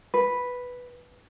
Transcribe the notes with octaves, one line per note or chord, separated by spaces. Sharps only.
B4